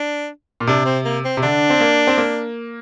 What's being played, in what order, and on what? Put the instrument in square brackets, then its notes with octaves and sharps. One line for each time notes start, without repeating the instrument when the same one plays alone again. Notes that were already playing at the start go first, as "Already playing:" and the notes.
Already playing: [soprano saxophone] D4
[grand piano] A#2
[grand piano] C3 [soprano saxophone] D4
[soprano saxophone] C4
A#3
C4
[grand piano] C3
[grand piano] D3 [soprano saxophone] D4
[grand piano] C4
A#3
C4
A#3